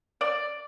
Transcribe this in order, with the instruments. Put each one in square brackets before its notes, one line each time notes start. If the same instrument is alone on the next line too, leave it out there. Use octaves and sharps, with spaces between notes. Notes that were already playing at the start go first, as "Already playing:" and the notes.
[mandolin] D5